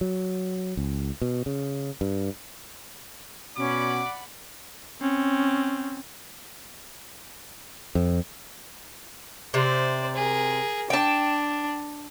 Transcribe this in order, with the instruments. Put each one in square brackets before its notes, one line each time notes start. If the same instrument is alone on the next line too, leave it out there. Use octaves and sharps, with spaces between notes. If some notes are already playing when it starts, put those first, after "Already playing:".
[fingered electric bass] F#3
C#2
B2
C#3
G2
[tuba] B2 [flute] C#4 [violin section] D5 F#5 B5 [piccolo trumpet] D6
[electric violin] C4 C#4
[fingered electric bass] F2
[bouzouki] C3 [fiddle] C5 D5
[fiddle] G#4 A#4
[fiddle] D4 [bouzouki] G5 A5